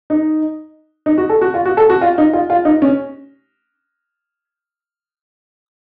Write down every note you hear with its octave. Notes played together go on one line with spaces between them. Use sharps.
D#4
D#4
F#4
A4
F#4
F4
F#4
A4
F#4
F4
D#4
F4
F4
D#4
C#4